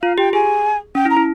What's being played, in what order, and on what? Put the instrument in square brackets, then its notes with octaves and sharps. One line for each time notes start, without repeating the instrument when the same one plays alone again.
[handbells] F4 [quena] F5
[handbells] G4 [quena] G5
[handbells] G#4 [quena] G#5
[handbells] C#4 [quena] G5
[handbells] E4
[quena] A#5
[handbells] E4